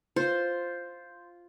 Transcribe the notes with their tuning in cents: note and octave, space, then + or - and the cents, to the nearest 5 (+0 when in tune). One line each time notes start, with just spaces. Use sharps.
F4 +0 C5 +0